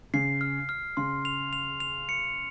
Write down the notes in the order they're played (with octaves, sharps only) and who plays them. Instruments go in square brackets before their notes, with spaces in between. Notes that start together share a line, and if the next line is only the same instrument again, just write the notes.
[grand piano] C#3 [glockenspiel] C7
[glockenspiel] F6
F6
[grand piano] C#3 [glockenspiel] C6
[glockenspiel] F7
F7
F7
C#7